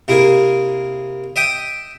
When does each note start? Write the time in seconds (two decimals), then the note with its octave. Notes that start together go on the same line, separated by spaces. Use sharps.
0.08 C3 A#3 E4 G#4 A#4
1.36 D#5 E5 G5 D#6